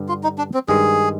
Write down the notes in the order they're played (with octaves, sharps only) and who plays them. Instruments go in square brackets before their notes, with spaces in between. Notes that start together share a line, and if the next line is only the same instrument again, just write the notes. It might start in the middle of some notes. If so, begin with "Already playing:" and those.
Already playing: [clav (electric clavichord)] G2 D3 G3
[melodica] F4
D#4
D4
C4
[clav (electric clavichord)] G2 D#3 G#3 [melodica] G#4